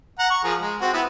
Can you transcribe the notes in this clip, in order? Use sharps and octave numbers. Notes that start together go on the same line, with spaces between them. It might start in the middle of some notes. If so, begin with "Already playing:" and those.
F#5 A#5
C#6
F3 G#4 A#4
G#3
C4 F#4
B3 E4 B4